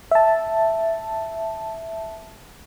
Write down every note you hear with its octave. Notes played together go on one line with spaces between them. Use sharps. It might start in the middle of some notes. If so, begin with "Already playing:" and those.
E5 A5